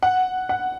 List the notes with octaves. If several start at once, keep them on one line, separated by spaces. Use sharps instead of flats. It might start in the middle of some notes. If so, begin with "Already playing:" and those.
F#5
F#5